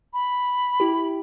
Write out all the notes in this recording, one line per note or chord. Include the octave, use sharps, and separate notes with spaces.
B5
E4 G4